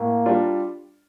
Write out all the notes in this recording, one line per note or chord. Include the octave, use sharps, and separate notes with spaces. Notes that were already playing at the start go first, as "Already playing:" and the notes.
Already playing: A2 A#3
G3 D4 F4